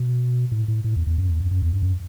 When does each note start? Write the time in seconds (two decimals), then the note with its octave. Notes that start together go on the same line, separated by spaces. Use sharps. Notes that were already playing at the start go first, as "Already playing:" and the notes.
Already playing: B2
0.52 A2
0.68 A2
0.84 A2
0.96 E2
1.07 E2
1.18 F#2
1.29 E2
1.40 F#2
1.51 F#2
1.62 E2
1.73 G2
1.83 F#2